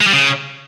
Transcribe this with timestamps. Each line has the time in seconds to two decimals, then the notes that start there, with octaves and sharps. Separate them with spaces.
0.01 G#3
0.07 G3
0.13 C#3